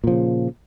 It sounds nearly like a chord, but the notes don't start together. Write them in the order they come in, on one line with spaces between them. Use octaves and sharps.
A#2 F3 C#3